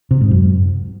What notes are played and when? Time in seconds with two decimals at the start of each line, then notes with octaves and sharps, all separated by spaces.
0.11 C3
0.21 G#2
0.31 F#2